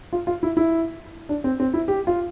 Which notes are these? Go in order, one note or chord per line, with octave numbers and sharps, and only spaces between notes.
F4
F4
E4
E4
D4
C4
C4
E4
G4
F4